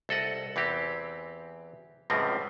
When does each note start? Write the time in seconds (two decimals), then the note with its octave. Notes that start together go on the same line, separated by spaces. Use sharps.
0.09 C2 A4 D#5 F#5
0.56 E2 E3 C4 G4
2.10 C#2 F#2 A2 F3 G3 C4